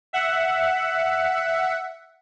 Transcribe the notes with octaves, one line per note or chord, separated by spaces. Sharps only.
E5 F#5